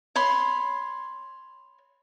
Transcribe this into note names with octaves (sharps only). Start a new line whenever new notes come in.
C#5 B5 C6